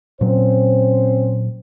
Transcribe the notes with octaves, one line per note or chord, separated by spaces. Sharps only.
A#2 F#3 C4 C#4 C5